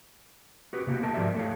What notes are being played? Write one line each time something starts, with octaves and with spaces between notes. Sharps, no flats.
F#4 G4 B4
C3 A#3 B3 F#4 G4
A3 A#3 F#4 A#4 D#5 A5
G#2 F3 G4 A#4 D5 E5
A3 A4 C#5 F5